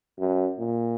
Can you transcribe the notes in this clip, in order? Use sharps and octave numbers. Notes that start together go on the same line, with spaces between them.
F#2
A#2